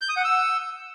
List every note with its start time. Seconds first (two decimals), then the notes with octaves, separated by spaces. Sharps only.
0.01 G6
0.09 D#6
0.17 F#5
0.24 E6